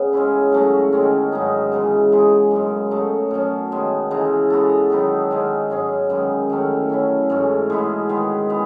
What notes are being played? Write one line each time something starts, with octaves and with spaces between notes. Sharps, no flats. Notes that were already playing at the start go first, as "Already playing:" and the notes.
Already playing: C#3 B3
G#3 C#4 E4
F#3 A3 C#4 F#4
D#3 G#3 C#4
G#2 F#3 B3 D#4
C#3 E3 G#3
G#3 D#4 G#4 B4
F#2 C#3 G#3
B2 F#3 A3 D#4
B2 F#3 C#4
D#3 G#3 B3
C#3 E3 G#3 D#4
G#3 B3 F#4 A4
D#3 F#3 B3 D#4
D#3 G#3 C#4
G#2 F#3 C#4 G#4
F#2 D#3 G#3 B3
D#3 A3 C#4 E4
F#3 C#4 E4
G#2 E3 A3 C#4
B2 G#3 B3 E4
D#3 G#3 B3
E3 B3